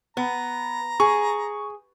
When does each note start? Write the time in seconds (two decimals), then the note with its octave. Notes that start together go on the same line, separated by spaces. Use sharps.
0.17 B3 A#5
1.00 G#4 C#6